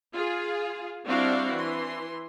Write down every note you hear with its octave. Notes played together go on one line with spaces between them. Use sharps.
F4 G#4
G3 C4 D4 E4 F#4 F5
E3 C6